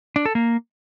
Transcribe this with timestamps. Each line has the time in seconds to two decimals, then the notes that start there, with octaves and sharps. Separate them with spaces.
0.16 D4
0.25 A4
0.35 A#3